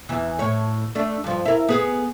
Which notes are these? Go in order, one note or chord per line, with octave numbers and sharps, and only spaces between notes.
E2 E3
A2 C#5
A3 D4
G2 F3
E4 A#4
B3 G#4